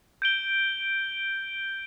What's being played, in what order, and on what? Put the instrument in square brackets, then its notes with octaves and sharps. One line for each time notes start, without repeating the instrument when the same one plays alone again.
[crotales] G6 D7 G7